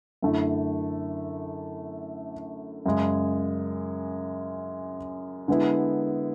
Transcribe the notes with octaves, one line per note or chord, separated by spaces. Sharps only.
F#2 D3 A3 E4
F#2 C#3 G#3
D3 G#3 B3 E4